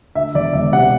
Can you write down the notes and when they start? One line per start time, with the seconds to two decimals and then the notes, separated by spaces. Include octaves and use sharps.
0.15 D2 E5
0.35 E1 D5
0.53 E1 E5
0.73 C3 F#5